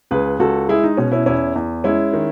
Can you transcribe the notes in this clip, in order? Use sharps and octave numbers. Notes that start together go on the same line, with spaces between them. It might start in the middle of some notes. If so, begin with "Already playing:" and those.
C#2 G#4 B4
C#2 F#4 A4
G#3 E4 G#4
D#4
B2 C#4
C#4 E4
E2 C#4 E4
E2
G#3 C#4 E4
D#3